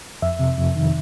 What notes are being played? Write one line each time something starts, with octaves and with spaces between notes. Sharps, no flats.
F2 E5
C3
F2
D#3